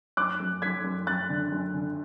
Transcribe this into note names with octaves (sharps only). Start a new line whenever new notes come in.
F#2 D6 F#6
F#2
F#2 G#6 B6
F#2
F#2 F#6 A6
D3
F#2
D3